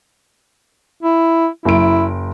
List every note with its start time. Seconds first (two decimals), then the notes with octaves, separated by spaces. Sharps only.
1.03 E4
1.65 F#1 E4 D7